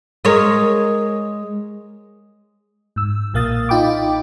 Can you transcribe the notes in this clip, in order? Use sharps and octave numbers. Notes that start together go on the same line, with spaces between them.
G#3 A#4 C#5
G#2 E6
B1 A#2 A#3 F5 D#6 A6
D#4 F4 G5 B5 D6